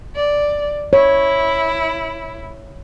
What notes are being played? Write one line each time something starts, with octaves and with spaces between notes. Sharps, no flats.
D5
E4 C#5